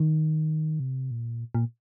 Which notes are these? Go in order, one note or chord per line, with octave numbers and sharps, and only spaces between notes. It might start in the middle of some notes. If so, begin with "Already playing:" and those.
Already playing: D#3
C3
A#2
A#2